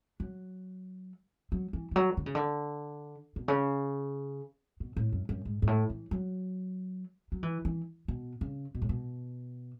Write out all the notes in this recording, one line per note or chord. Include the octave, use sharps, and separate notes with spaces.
F#3
F#3
E3
E3
F#3
D3
C#3
D3
B2
C#3
B2
A2
F#2
F#2
G#2
G#2
A2
E3
F#3
F#3
E3
E3
B2
C#3
B2
A2
B2